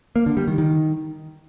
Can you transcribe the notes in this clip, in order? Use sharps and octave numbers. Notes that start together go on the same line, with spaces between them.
A#3
D3
G3
D#3
D#3